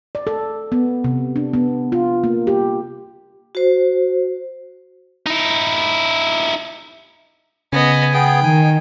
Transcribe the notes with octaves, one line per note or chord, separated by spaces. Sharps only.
D5
A4
B3
C3
D4
B3
F4
A#3
G4
F#4 C5
D#4 E4
C#3 B3 D#5 G#5
B3 G#4 G5
D#3 G#5